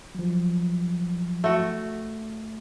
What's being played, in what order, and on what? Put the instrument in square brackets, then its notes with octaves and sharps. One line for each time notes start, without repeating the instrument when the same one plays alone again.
[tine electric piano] F3 F#3
[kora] A3 F#4